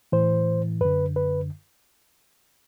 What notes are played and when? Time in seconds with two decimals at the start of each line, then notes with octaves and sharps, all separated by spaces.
0.12 A2 E3 C5
0.81 F#2 D3 B4
1.16 B4